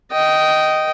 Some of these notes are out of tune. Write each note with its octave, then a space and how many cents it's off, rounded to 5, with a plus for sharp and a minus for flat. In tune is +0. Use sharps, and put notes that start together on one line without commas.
D#5 +0 G5 -20